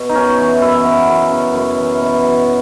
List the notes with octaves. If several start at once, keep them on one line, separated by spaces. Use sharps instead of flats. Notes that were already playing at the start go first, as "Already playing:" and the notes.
Already playing: B2
D#4
F#2 C#4
E3
F#2 E4
B3
F#2
C#3
F#2
E3
B2
F#3